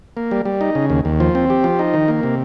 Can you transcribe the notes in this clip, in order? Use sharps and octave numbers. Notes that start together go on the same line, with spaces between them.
A#3
G3
G3
D#4
C#3
D#2
D#2
F3
C4
G4
F3
D#4
D#3
A#3
C3